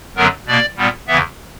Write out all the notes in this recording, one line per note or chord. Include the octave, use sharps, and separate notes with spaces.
F#2 D3 F#3 B3 A#4
B2 A#3 D5
A#2 G3 B3
E2 C#3 E3 B3 E5